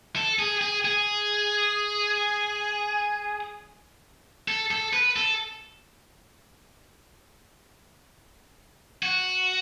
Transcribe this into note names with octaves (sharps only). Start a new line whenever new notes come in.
A4
G#4
G#4
G#4
A4
A4
B4
A4
F#4